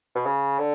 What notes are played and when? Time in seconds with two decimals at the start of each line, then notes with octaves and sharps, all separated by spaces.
0.15 B2
0.26 C#3
0.59 D3